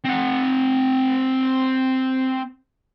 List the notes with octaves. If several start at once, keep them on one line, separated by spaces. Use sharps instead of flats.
C4 F#5